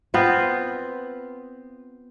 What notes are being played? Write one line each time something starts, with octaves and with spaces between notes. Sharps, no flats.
B3 C4 F4 B4